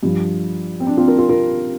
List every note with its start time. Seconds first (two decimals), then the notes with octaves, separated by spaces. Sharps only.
0.03 G2 F3
0.80 C4
0.87 D4
0.97 C4 F4
1.08 F4 A#4
1.18 F4 A#4
1.29 F4 A#4